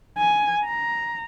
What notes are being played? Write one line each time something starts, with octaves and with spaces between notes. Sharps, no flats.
G#5
A#5